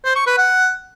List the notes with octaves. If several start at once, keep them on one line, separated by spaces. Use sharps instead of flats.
C5
C#6
B4
F#5